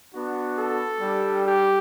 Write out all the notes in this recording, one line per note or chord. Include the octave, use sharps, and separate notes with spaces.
B3 D4 F#4
A4
G3 D4 G4
G4